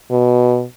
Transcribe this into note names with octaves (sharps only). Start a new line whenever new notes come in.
B2